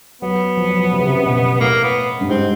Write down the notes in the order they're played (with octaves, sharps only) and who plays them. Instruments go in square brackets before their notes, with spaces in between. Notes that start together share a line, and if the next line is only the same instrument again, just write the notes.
[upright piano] F#3 [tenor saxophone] B3
[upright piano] F3
F#3
F3
C3
C#3
C3
B2
[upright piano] A2 [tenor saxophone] A#3
[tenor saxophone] B3
[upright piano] G2
[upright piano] G#2 [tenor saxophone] C4